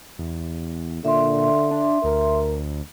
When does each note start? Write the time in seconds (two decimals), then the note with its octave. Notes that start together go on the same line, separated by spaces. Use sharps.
0.19 E2
1.05 A#2 D3 E5 C6
1.71 D4
2.04 D2 A#4